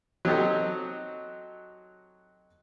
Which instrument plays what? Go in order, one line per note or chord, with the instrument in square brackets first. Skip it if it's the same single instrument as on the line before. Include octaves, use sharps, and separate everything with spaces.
[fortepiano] F#3 C4 D#4 G4 A4 D#5